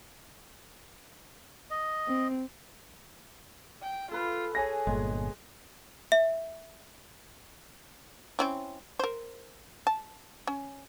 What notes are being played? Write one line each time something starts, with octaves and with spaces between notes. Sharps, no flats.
D#5
C4
G5
F4 A4 B4
G#4 C#5 G#5 A#6
G1 A#2 G#3
E5
C4 C#4 E4
A#4 C5
A5
C#4